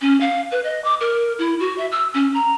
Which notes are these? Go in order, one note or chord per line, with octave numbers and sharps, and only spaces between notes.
C#4
F5
B4
D#5
D6
A#4
E4
F#4
E5
E6
C#4
A#5